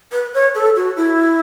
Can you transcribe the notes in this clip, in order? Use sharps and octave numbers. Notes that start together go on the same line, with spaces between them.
B4
C#5
A4
F#4
E4